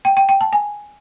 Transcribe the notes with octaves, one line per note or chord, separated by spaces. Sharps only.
G5
G5
G5
A5
G#5